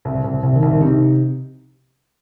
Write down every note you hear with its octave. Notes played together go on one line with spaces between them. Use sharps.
C2
C2
C2 C3
D#3
C2
D#3
C3 D#4